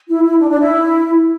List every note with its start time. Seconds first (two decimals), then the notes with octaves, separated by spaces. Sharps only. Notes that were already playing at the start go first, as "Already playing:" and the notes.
0.08 E4
0.23 E4
0.39 D4
0.50 D4
0.60 E4